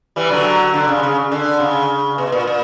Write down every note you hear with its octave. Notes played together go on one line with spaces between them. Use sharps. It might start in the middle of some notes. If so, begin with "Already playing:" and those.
E3 G3
D3 F#3
D3
C#3
C#3
D3
C#3
B2
A#2
A#2